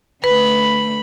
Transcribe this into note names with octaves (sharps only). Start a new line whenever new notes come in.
D3 A3 B4 B5